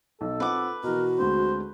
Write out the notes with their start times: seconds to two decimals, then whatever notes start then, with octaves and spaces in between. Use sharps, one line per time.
0.21 B1 A4
0.40 C4 F4 B4 F#5 D6
0.83 B2 E3 F#4 A#4
1.19 D2 G#3 C4 C5